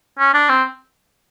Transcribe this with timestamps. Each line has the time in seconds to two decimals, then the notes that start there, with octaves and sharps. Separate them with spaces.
0.19 C#4
0.34 D4
0.49 C4